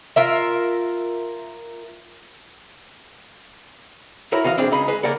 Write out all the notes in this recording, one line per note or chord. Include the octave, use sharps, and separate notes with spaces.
F4 A#4 E5
E4 F#4 A#4 C#5
E3 F#4 D#5 F5
B1 G#3 C4 D4 G5
C#2 C#3 D#4 B5
G#3 B4
C#3 A#3 A#4 D5 F#5